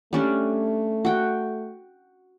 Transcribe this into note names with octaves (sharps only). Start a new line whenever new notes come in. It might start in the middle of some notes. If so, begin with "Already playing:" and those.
G3 A3 C#4 D4
F#4 G5